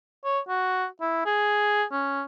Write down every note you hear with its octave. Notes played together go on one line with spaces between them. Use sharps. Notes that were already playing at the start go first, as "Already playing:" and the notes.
C#5
F#4
E4
G#4
C#4